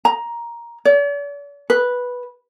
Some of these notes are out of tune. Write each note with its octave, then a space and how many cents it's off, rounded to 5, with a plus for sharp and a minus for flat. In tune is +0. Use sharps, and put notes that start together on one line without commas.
A#5 +10
D5 -45
B4 -5